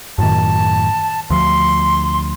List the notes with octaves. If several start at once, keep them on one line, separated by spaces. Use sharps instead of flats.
F#2 A2 D#3 A5
D2 F3 C6